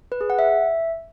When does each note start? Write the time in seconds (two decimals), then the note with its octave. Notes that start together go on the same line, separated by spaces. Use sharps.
0.12 B4
0.21 G#4
0.30 F#5
0.39 E5